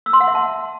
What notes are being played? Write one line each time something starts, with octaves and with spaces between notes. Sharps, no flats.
E6
C6
F#5
E5
A5